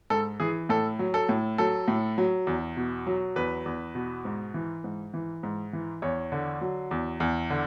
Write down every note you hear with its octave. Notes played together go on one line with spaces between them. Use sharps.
G#2 A4
E3 G#4
A2 A4
F#3
A4
A2
F#3 A4
A2
F#3
E2
B2
F#3
E2 B4
E2
B2
G#2
E3
G#2
E3
G#2
E3
E2 C#5
D3
F#3
E2
E2
D3